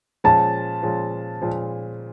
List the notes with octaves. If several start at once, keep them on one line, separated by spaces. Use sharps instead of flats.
A#2 F3 G#3 C#4 F4 A5
A#2 F3 G#3 C#4 F4
A#2 F3 G#3 C#4 F4